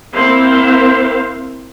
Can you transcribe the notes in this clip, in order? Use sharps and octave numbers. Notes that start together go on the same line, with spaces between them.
A#3 C4 E4 C5 F5